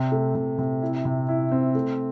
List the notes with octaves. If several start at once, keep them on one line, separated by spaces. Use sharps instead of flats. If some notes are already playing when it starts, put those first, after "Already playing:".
Already playing: C3
A3
C3
C3
E4
C3
E4
C4
A3